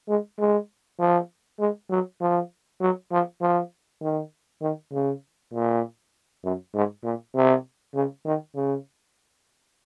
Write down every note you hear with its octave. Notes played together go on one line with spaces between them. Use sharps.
G#3
G#3
F3
G#3
F#3
F3
F#3
F3
F3
D#3
D#3
C#3
A#2
F#2
G#2
A#2
C3
C#3
D#3
C#3